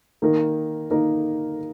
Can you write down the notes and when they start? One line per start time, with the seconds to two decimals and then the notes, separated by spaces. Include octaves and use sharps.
0.22 D#3 A#3 D#4 A#4
0.90 D#3 A#3 D#4 A#4